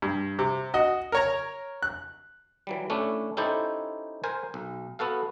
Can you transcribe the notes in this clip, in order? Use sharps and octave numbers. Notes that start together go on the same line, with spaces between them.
G2
C3
F#4 D#5
A#4 C#5 A#5
F#6
E3 F#3 G3
A3 C#4 D4 E4
C#4 D#4 E4 G4 A4 C5
A#4 C5 G#5
B1
B3 F#4 A4 F5